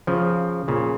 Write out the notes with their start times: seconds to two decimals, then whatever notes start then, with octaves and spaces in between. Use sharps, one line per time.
0.07 C#3 F3
0.68 A#2 C#3